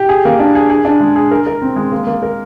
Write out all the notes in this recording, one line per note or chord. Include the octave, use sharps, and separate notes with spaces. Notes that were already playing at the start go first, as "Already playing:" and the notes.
Already playing: G4
G#4
A#3
D4
G#4
G#4
D4
G#3
G#4
A#4
A#4
C4
G#3
A#3
A#3
A#4